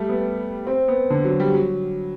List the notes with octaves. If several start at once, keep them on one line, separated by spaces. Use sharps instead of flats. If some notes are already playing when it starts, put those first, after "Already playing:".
Already playing: G3 A3
B3
C4
B3
D3
F#3
G3
F#3